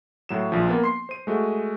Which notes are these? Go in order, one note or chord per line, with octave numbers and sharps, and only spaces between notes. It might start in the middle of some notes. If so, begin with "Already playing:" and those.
A2 F#3 E7
A#1 F3
A#3 B3
C6 C7
C5 D#7
G#3 A3 F#4